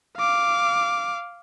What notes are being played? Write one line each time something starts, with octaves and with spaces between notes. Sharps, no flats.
F5 D6